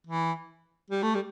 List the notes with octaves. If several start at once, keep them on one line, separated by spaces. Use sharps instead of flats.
E3
G3
A3
G3